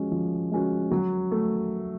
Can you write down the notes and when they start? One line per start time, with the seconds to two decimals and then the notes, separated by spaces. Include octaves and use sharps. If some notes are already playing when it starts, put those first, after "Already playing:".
Already playing: F3 G#3 C#4 F#4
0.12 F3
0.51 G#3 C#4 F#4
0.91 F#3
1.31 A3